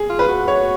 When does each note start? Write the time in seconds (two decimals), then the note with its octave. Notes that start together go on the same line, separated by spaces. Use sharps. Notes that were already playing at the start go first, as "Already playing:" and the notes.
Already playing: G#4
0.10 F4
0.19 B4
0.29 F#4
0.47 F#4 C#5